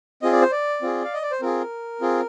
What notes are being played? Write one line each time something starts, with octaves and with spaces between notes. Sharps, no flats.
C4 F4 G#4 D#5
D5
C5
D5
C4 F4 G#4
F5
D#5
D5
C5
C4 F4 G#4 A#4
C4 F4 G#4